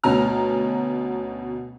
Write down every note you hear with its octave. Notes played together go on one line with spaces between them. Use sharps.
D2 B2 C#4 A#5 F6